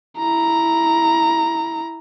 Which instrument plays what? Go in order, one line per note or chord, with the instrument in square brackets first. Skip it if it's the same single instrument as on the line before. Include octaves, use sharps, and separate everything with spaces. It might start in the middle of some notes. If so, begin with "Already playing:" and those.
[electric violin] E4 A#5